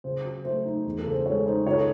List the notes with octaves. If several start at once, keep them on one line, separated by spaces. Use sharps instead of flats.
C#3 C5
F#3
A3 C5
D#4
E2
A4
C#3
C5
G#3 A4 C#5
D#4 C5
C#2 A4 C#5